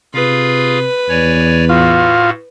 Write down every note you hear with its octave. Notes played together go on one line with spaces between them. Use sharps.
C3 F4 G#4 B4 F5
E2 C#5 D5 G#5
A2 F4 F#4